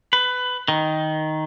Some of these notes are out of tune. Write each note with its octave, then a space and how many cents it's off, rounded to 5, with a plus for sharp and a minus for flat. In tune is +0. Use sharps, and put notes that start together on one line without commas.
B4 +15
D#3 +5